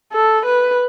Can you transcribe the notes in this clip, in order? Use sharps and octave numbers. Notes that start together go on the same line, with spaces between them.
A4
B4